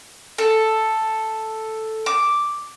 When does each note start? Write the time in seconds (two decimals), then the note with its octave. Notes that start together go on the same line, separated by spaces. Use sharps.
0.38 A4
2.06 D6